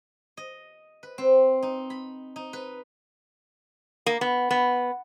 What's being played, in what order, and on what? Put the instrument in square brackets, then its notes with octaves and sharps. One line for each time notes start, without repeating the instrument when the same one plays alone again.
[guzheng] D#5
B4
C4
D#4
B5
D#4
B4
[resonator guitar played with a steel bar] A#3
B3
B3